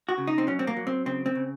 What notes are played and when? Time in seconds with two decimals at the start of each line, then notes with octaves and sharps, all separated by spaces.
0.09 F#4
0.18 C#3
0.27 D#4
0.38 C4
0.47 F#3 C#4
0.59 C4
0.67 A#3
0.77 F#3
0.87 C4
1.06 C#3 C4
1.26 C4
1.35 C#3